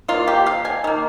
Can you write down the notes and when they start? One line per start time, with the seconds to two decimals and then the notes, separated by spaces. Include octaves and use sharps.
0.08 D#3 A#3 F4
0.28 G4
0.46 F5
0.65 G#5
0.84 D#3 A#3